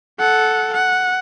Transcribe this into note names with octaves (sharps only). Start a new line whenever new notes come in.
A4 F#5
F#5